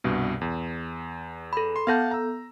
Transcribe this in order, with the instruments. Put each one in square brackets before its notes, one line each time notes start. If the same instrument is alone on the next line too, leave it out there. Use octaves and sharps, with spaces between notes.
[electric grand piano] C2 G2 B2
E2
[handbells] A4 B5
[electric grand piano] C6
[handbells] B3 A4 G6 [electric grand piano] F5 F#5 A5
[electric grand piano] A#5 E6